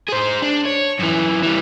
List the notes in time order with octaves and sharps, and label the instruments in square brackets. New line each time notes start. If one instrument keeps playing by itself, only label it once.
[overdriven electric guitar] G#4 C5
D4
C#5
F#2 E3
E3 G3